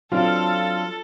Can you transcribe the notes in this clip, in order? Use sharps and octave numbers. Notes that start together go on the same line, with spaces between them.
F#3 C4 D4 F4 A4